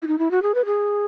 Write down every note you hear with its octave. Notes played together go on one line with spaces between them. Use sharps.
E4
D#4
E4
F#4
G#4
B4
G#4